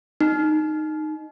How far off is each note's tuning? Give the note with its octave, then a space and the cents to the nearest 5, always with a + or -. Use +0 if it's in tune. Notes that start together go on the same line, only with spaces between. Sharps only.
D#4 -10